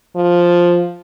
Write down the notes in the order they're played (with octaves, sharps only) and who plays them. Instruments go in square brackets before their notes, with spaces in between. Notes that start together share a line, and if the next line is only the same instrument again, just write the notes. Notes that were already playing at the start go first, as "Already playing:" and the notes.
[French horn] F3